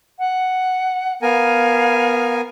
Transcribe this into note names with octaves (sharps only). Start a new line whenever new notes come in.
F#5
B3 A#4 F5 G#5